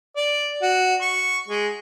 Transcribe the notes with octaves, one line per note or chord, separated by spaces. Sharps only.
D5
F#4
C#6
G#3